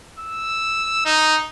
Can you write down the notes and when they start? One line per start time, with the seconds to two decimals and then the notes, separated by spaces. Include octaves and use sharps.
0.19 E6
1.05 D#4